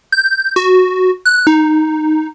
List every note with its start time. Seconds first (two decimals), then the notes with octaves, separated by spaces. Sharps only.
0.12 G6
0.56 F#4
1.25 F#6
1.47 D#4